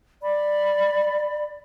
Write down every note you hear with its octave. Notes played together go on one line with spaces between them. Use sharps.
D5 B5